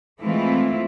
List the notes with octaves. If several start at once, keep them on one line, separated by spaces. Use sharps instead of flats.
E3 G#3 A3 C4 E4 F4